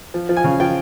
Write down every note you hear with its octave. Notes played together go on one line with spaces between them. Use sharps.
F3
F3
G#5
C#3
F3 G5